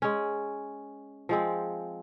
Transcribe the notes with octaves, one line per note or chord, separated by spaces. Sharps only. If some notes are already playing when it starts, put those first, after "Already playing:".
G#3 C#4
F3 G#3 C4